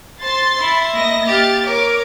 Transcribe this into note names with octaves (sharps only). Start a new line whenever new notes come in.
C5 C6 A6
E4 E5
A#3 D#5 A#6
G4 F5 A6
A#4 C#5 D6